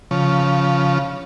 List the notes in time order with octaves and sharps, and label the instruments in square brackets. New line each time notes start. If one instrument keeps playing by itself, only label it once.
[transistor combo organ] C#3 F3